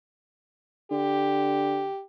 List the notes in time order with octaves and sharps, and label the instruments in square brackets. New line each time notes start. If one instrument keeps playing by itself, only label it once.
[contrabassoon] D3 [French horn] G4